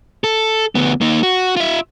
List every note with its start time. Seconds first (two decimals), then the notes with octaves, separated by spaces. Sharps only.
0.24 A4
0.75 D2 B3
1.01 A#3 D#4
1.23 F#4
1.56 F4 E5